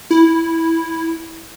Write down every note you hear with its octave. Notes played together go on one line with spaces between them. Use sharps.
E4